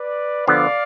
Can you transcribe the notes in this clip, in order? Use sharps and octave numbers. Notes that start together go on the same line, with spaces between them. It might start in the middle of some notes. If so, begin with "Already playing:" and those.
Already playing: B4 D5
D3 F3 B3 D5 F5